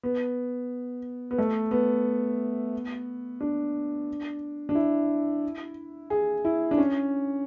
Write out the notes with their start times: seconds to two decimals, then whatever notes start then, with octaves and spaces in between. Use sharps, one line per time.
0.03 B3
1.31 B3
1.38 A3
1.71 B3
3.41 D4
4.69 D4
4.75 E4
6.10 G#4
6.45 E4
6.71 D4
6.78 C#4